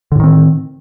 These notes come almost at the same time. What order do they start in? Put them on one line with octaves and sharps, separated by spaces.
D3 A2 D#3 C4